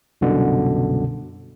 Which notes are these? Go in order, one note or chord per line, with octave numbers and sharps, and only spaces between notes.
C2 F#2 B2 D3